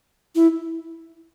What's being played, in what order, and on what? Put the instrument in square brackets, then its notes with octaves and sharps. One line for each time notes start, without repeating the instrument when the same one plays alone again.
[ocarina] E4